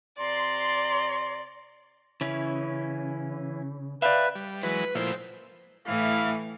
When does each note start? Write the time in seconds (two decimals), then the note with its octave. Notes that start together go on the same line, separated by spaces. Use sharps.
0.19 C3 D5 A#5 C6
2.21 C#3 E3 C#4 E4
4.02 B4 D5 E5 F5 G5
4.35 G3
4.63 E3 F#3 G#3 B4
4.95 A#2 F3 A3 E4 C5
5.87 A2 E3 E4 F5